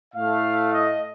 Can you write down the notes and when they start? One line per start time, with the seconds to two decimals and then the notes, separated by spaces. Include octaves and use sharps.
0.14 A2 A3 F5
0.72 D#5